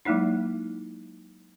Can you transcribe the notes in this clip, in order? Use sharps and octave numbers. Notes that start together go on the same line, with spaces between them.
F#3 G#3 A#3 D#4 E4